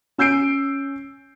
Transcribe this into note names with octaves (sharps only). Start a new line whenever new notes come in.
C#4 E6 G6 C7 D7